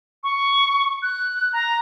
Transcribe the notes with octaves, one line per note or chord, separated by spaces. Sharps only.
C#6
F#6
A#5